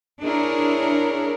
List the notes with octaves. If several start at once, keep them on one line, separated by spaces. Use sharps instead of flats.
D4 E4 G#4 A#4 C#5